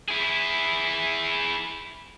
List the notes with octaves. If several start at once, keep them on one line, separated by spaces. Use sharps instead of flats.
E4 G#4